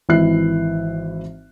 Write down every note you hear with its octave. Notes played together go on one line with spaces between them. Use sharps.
G#1 E3 E4 E5 F#6 C7